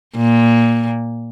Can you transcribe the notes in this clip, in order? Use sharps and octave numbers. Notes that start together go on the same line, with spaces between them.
A#2